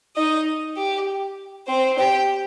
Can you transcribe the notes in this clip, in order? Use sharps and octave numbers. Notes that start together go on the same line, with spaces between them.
D#4 D#5
G4
C4 C5
G4 G5